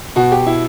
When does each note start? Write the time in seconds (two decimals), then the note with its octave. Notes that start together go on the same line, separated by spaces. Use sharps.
0.16 B2 F#4
0.32 G4
0.46 E4